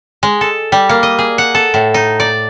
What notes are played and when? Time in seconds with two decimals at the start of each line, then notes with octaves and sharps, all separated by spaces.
0.23 G#3
0.41 A4
0.72 G3
0.89 A#3
1.03 D#5
1.18 G#4
1.38 F#5
1.55 A4
1.74 A2
1.94 D#4
2.20 D5